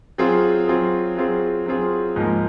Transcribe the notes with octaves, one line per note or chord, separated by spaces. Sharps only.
F#3 C4 F4 G#4
F#3 C4 F4 G#4
F#3 C4 F4 G#4
F#3 C4 F4 G#4
G#2 F3 A#3